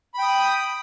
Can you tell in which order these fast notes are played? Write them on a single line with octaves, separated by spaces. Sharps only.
B5 G5 D#6